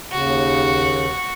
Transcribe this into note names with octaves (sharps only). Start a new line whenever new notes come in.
D#2 C#3 F#4